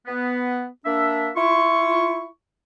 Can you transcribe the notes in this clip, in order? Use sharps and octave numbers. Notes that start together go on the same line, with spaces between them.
B3
A#3 D4 E5
E4 F4 C#6